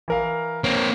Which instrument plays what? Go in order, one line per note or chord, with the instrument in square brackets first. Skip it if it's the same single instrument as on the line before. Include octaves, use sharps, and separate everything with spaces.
[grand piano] E3 A#4 F5
[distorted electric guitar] A#3 C4 [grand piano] C#5